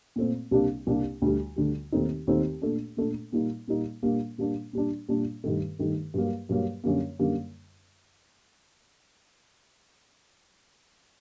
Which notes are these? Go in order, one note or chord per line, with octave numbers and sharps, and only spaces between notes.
A#2 A3 C4
C2 C3 G3 A#3 D4
C2 C3 G3 A#3 D4
D2 D3 G3
D2 D3 G3
D#2 D#3 A3 C4 D#4
D#2 D#3 A3 C4 D#4
A#2 A3 D4
A#2 A3 D4
A#2 G3 A#3 D#4
A#2 G3 A#3 D#4
A#2 G3 A#3 D4
A#2 G3 A#3 D4
A#2 G3 D4
A#2 G3 D4
G2 D#3 A3
G2 D#3 A3
G2 F#3 A#3
G2 F#3 A#3
F#2 D3 G3 A#3
F#2 D3 G3 A#3